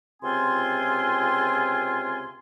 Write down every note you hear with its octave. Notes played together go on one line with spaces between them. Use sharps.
C#2 C3 C4 F4 G#5 C6